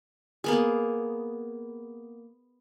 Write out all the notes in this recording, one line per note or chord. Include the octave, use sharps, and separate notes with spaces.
A#3 B3 G#4